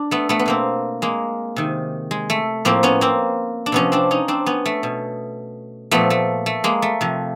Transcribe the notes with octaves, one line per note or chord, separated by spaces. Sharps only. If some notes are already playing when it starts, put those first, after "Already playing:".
Already playing: D4
A3 B3
A3 B3
B3
B2 A#3 C4
G#3 A#3
C3 D#3
G#3
A3
A2 F3 A#3 C4
B3 C#4
A#3 C4
D4
C3 F3 B3 C#4
C4 D4
C#4 D#4
C4 D4
B3 C#4
A3
B2
A#2 F3 A3 B3
A3
A3
G#3 A#3
A3
C3 F3